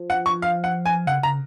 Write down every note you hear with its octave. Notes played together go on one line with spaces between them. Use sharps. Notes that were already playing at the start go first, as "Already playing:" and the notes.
Already playing: F3
F#5
C#6
F5
F#5
G#5
C#3 F#5
C#3 A#5